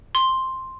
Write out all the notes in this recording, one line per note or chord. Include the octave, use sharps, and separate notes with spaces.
C6